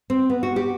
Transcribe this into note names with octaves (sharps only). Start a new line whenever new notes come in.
C4
B3
F#4
G4